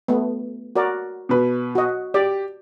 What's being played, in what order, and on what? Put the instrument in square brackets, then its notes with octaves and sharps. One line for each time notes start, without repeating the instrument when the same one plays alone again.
[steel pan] A3 B3
F#4 A#4 D5
[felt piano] B2 B4
[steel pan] F#4 D#5
[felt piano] G4 [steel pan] D5